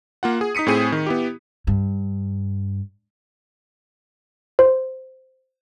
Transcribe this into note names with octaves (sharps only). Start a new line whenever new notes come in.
A#3 F4 F#5
G#4
D#4 D#6 B6 C#7 D#7
A2 C4 G#4 D#7
D#3
B3 E4 G4
G2
C5